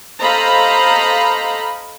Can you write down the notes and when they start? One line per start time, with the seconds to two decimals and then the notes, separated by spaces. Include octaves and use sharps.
0.22 A4 C5 D#5 F5 A#5 B5